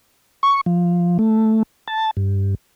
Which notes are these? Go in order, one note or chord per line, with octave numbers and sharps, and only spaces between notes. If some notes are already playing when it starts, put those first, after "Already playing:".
C#6
F3
A3
A5
G2